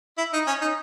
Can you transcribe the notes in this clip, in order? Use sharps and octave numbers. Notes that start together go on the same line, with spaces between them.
E4
D#4
C#4
D#4